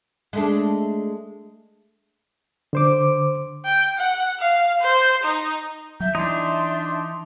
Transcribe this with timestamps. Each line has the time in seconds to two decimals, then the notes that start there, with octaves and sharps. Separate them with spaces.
0.33 G#3 A3 D4
2.73 D3 C5 D6
3.65 G5
3.99 F#5
4.40 F5
4.81 C5
5.24 D#4
6.00 F#3 E5 G6
6.15 E3 D4 D#4 C6